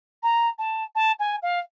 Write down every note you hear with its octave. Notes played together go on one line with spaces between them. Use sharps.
A#5
A5
A5
G#5
F5